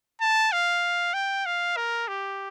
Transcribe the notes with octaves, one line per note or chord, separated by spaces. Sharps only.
A5
F5
G5
F5
A#4
G4